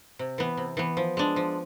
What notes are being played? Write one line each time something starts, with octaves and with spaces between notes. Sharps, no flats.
C3
E3 B3
C3
E3 B3
F3
G#3 D4
F3